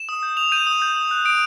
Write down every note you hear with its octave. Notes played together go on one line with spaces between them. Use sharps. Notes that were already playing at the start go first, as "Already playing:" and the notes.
Already playing: E7
D#6
G6
D#6 F7
G6 D#7
D#6
G6
D#6
F#6
D#6 D7